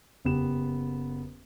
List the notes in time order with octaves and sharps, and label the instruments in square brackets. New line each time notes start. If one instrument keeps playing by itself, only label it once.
[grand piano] F#1 B3 G4 E7